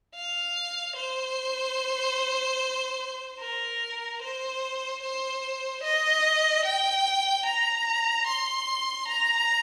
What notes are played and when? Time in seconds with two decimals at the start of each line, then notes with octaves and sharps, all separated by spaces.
0.15 F5
0.96 C5
3.40 A#4
4.22 C5
5.02 C5
5.83 D#5
6.65 G5
7.46 A#5
8.27 C6
9.08 A#5